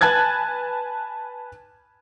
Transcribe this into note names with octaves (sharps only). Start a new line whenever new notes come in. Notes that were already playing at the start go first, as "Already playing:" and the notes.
B4 G#5 A5 F#6 G#6 A6